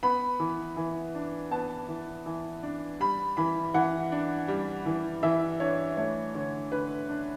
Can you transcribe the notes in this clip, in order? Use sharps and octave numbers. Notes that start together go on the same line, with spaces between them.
B3 B5
E3
E3
D4
B3 A5
E3
E3
D4
G3 B5
E3 B5
E3 F#5
D4
G3
E3
E3 E5
D4 C#5
A3 C#5
D3 C#5
D3 B4
D4